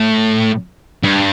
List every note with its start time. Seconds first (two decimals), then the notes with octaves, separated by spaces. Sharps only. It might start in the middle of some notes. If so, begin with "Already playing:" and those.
Already playing: A2
1.04 G2